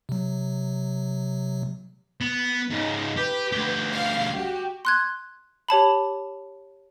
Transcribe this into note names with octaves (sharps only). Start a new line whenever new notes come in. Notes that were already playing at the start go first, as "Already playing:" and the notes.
C3 F#3
B3
G#2 C#3 D#4
G4 B4
D2 G4
F5
F#4 G4
C6 F#6 G#6
G4 C#5 A5 B5